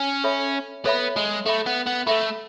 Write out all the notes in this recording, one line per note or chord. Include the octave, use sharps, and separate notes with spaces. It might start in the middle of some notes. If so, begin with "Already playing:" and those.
Already playing: C#4
A4 C#5 E5 B5
B3 A4 C#5 E5 B5
G#3
A3 A4 E5 B5
B3
B3
A3 A4 E5 B5